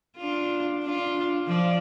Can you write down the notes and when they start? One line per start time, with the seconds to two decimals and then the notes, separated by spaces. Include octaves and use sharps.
0.17 D4 F4
0.83 D4 F4
1.47 F3 D5